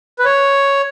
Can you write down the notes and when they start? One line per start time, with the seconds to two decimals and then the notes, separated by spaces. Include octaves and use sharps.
0.19 B4
0.25 C#5